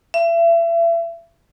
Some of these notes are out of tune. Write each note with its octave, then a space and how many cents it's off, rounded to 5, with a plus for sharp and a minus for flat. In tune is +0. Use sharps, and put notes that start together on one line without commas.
E5 +35